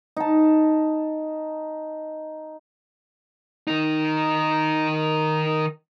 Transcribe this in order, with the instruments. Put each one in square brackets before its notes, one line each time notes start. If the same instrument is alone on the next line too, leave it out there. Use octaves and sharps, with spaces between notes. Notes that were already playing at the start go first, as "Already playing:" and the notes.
[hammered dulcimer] D#4 A5
[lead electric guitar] D#3 D#4